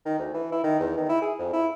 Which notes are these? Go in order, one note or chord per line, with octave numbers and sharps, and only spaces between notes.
D#3
D2
E3
E4
D#3
E2
D#3
E4
G#4
F2
E4